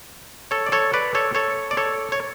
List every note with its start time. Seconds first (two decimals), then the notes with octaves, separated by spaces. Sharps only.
0.51 A4 C#5
0.66 D5
0.72 A4 C#5
0.94 B4 D5
1.15 A4 C#5
1.35 A4 C#5
1.71 D5
1.77 A4 C#5
2.12 C#5